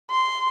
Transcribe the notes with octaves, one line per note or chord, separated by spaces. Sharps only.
C6